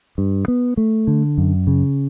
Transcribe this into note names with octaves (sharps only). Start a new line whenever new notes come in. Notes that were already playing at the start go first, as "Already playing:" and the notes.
G2
B3
A3
D3
F#2
C#3